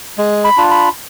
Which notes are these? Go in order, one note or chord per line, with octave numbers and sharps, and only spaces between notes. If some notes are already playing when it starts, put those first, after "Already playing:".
G#3
B5
D4 F4
B5